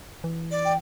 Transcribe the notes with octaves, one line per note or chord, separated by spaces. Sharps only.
E3
D5
G5